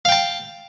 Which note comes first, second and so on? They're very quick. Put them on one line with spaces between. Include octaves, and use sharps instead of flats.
F5 G5 A5